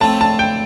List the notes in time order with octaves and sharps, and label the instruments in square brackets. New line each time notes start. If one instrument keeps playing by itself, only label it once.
[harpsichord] A2 F3 A3 C4 F4 [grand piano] A5
[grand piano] A5
G5